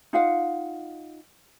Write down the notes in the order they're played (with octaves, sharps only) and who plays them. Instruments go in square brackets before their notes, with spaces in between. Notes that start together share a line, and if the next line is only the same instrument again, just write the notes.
[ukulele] D#4 F4 F5 F#5